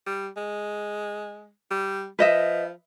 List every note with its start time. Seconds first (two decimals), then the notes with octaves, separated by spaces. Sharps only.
0.06 G3
0.36 G#3
1.71 G3
2.19 F3 B4 D#5 E5